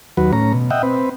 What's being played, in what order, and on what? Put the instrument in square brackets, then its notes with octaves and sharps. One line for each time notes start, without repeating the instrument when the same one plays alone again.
[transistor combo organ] D#2 F#3 F#4 B4
A2 C#4 A#5
B2
D#5 E5 F#5 G5
C4 B4